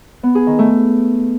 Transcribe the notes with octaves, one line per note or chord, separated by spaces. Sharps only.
B3
G#4
D#3
A3